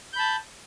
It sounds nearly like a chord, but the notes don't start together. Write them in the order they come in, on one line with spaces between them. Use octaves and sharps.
G6 B5 A5